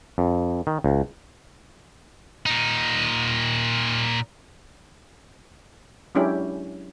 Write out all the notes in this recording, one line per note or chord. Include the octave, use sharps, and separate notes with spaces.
F2
D#3
C#2
A#2 D#4
F#3 G#3 C#4 D4 E4 G4